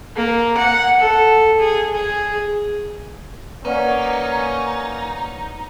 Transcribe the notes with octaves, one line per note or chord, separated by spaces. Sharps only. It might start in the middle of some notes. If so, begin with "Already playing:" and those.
A#3
F#5
A4
G#4
G#4
A#3 C#4 D#4 B4 D5 F#5